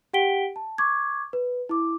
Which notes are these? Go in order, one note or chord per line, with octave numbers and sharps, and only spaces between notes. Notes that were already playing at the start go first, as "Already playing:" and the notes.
G4 F#5 G5 B6 D7 G7
A5
C#6 D6 G#6
B4
E4 D6